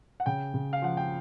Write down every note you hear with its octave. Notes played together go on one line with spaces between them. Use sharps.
F#5
C#3 G5
C#3
F5
F3 F#5
G5